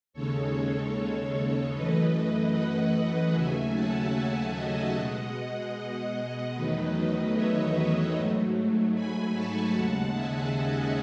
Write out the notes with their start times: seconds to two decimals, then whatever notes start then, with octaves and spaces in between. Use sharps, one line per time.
0.13 D#2 C#3 G#3 A4 C#5
1.73 F#2 E3 A3 B4 D#5
2.54 D#5 F#5
3.33 D#2 C#3 F#3 A3 E5 G#5
3.74 F#5 A5
4.14 E5 G#5
4.54 D#5 F#5
4.94 B2 G#3
6.54 E2 D#3 F#3 A3 B4 D#5
7.34 C#5 E5
8.14 G#2 F#3 A3
8.95 G#5 B5
9.34 A5 C#6
9.74 D#2 C#3 G#3 F#5 A5
10.14 E5 G#5
10.54 D#5 F#5